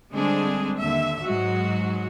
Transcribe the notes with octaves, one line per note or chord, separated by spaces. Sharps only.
D3 G3 G#3 C4 D4 G#4
D#2 D3 E5
G#2 F#3 G#3 F#4